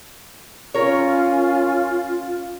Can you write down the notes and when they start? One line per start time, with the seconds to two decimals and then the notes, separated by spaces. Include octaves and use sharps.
0.74 C#4 F4 A#4 C#5